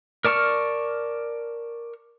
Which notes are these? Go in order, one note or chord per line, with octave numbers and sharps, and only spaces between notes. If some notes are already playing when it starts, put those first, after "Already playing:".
A#4 D5 A5 C#6 F6